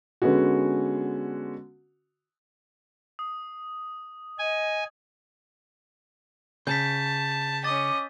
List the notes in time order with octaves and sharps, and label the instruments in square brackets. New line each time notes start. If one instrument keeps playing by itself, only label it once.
[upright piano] D3 G#3 B3 C#4 F#4
[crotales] D#6
[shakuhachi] D#5 [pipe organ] G#5
[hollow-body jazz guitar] C#3 [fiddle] A5 [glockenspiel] G6 B6
[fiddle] C#4 D#5 [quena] D6 [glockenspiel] A6